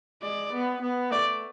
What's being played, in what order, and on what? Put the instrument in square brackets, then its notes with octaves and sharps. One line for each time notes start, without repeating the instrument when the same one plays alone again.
[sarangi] G#3 [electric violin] D5
[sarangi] B3
B3
[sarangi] A3 [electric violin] D5